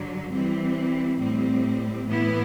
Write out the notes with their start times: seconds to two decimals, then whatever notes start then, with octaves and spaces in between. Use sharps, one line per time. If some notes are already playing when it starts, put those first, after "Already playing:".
Already playing: G2 D3 F#3
0.31 E3 G3 C4
1.20 A2 G3 C4
2.07 A2 E3 B3 E4